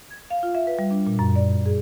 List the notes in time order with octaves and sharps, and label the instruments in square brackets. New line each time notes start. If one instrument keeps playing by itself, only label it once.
[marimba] G#6
F5
F4
E5
B4
G3
D4
A#2
F#2
D5
G2
G#4